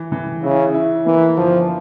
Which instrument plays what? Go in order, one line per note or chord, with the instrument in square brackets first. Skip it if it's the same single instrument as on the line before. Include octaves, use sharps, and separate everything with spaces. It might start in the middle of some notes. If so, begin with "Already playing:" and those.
Already playing: [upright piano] E3
E3
[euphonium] C#3 [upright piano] E4
[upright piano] E4
[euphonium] E3 [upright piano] A#3
[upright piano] G1 [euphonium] F3